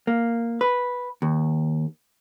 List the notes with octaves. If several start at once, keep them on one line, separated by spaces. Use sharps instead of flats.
A#3
B4
D#2